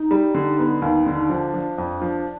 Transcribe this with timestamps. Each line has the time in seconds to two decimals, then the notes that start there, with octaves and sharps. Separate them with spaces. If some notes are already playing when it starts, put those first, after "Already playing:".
Already playing: D#4
0.11 G3
0.35 D3
0.59 B3
0.82 D#2
1.06 D3
1.30 F3 D4
1.54 F3
1.78 F2
2.02 F3